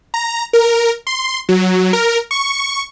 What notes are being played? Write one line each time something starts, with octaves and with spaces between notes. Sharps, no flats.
A#5
A#4
C6
F#3
A#4
C#6